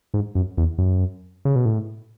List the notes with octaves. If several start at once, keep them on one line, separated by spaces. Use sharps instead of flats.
G#2
F#2
E2
F#2
C#3
B2
A2